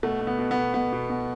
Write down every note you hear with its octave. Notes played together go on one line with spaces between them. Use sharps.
B2 A3
B2
B3
B2
B3
B2
B2 B3
B2
B2